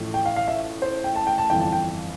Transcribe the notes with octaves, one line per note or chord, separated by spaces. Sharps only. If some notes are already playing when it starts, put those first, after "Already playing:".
Already playing: A1 A2 F3 A3
G5
F5
F5
E5
C5
G5
A5
G5
A5
G1 F2 E3 G5
A5
G5